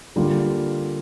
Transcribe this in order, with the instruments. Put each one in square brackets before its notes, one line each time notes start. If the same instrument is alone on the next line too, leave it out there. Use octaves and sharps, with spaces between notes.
[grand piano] D3 G3 A#3 F4